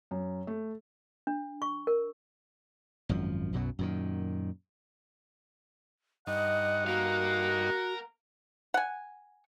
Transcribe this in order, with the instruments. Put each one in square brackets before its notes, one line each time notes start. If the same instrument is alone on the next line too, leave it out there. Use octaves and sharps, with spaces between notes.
[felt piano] F#2
A3
[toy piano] D4
C#6
A#4
[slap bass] G#1 F#2 F3
B1 F#2 B2 F#3
F#2 A#2 D#3
[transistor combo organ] G2 D#4 [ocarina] D#5 [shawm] F#5
[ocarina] F#4 [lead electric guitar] A#4 F5
[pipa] F#5 G#5